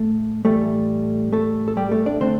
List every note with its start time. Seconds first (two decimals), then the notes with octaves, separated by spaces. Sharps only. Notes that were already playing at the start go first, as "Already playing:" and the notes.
Already playing: A2 A3 A4
0.45 A2 E3 G3 A3 A4
1.32 A3 A4
1.68 A4
1.77 G3 G4
1.91 A3 A4
2.06 D4 D5
2.20 D3 A3 C4 D4 C5